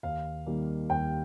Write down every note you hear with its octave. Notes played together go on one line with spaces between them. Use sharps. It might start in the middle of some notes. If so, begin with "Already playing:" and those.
D#2 F5
D#3 G3 A#3
D#2 G5